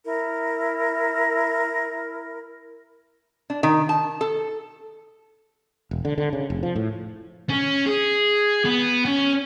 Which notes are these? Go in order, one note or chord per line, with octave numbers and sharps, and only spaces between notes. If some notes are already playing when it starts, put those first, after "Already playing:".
E4 A#4
D4
D#3
A5
A4
E1
D3
D3
C#3
F1
F3
A2
C#4
G#4
B3
C#4